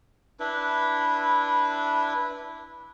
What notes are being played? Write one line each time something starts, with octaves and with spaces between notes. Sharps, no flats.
D4 E4 B4